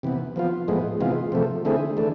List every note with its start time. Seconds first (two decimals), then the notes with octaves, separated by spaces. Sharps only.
0.03 C3 E3 B3
0.36 F3 B3 F4
0.68 A2 F3 G#3 B3
1.00 C3 E3 G#3 B3 F4
1.32 C3 F3 A3
1.65 D3 A3 C4 E4 G#4
1.97 E3 A3 D4